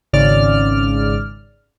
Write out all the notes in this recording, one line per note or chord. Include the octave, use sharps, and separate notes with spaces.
G#1 G#2 C#3 D5 F6